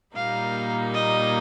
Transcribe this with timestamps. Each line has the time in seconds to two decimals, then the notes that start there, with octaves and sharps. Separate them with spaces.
0.16 A#2 G3 A#3 D#4 F5
0.95 D#5